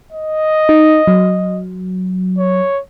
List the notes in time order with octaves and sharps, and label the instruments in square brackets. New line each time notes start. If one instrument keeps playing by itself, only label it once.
[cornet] D#5
[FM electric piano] D#4
F#3
[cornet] C#5